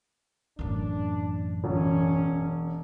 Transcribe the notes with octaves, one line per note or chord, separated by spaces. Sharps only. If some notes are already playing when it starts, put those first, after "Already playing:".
A1 F#2 D4
E1 C#4